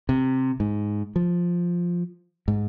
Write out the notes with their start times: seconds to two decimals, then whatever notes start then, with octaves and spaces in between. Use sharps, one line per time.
0.09 C3
0.60 G#2
1.16 F3
2.48 G#2